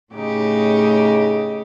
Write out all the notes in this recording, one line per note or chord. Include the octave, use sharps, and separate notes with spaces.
A2 C#3 D#4 G4